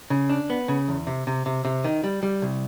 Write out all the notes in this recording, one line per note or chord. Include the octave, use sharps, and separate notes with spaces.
C#3
D4
B3
C#3
E2
C3
C3
C3
C3
D#3
G3
G3
C2